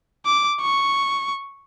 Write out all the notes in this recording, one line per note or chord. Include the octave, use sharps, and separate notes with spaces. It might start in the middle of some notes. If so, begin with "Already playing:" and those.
D6
C#6